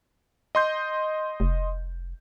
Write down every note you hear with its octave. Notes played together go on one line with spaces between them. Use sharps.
D#5 C6 G6
F1